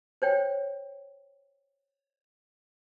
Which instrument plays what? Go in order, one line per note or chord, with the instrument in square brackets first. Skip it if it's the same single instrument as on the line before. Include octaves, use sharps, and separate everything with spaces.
[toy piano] C5 C#5 G5